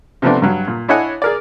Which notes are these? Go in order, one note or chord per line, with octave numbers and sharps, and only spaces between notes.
C3 F3 A3 B3 D4
G2 F#3
A#2
D4 E4 C#5 D#5 F#5 G#5
G#4 A#4 D5